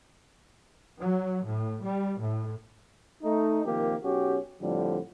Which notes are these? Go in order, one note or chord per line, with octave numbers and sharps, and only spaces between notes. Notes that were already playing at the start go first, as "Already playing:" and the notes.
F#3
A2
G3
A2
A3 D#4
C3 D#3 F3 A#3 G4
B1 C#4 F#4 G4
F2 A2 D3 F3 G3